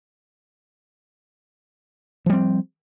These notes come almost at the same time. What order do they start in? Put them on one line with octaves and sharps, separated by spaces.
F3 G3 C4